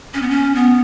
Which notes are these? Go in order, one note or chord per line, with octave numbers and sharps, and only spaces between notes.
C#4
B3
C#4
B3